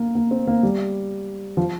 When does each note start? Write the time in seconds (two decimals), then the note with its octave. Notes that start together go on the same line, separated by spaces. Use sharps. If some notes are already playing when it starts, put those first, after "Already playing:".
Already playing: A#3
0.15 A#3
0.31 C4
0.47 A#3
0.63 G3
1.57 F3